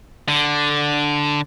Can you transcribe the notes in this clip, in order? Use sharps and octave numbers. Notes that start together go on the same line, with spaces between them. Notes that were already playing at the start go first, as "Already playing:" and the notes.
D3